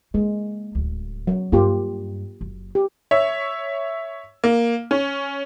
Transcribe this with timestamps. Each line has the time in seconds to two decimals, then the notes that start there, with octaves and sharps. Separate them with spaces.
0.14 G#3 A#3
0.75 D1 D2
1.27 F#3
1.52 G2 A#3 F4 G4
2.41 F#1
2.75 G4
3.11 C#5 E5
4.44 A#3
4.91 C#4